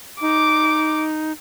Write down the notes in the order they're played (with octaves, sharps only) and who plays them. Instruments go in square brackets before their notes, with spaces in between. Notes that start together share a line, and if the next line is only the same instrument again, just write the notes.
[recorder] D#4 [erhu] D6